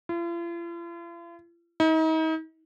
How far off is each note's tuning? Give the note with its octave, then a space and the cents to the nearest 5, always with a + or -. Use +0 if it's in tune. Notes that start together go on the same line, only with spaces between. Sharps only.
F4 -45
D#4 +40